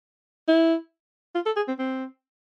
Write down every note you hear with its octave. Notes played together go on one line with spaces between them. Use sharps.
E4
F4
A4
G#4
C4
C4